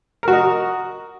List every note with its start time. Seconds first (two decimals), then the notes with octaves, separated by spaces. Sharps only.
0.23 A#4
0.28 F#4
0.32 D#5